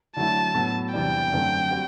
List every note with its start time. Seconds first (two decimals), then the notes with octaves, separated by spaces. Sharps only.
0.17 D3 F#3 A3 E4 A5
0.54 A2 F#3 B3
0.94 E2 C3 E3 G3 D4 G5
1.32 F#2 D3 A3 C4
1.71 G3 C4 F#4